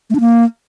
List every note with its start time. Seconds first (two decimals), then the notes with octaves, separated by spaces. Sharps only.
0.10 A3
0.15 D4
0.20 A#3